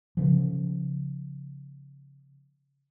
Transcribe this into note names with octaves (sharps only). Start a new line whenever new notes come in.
C#3 F3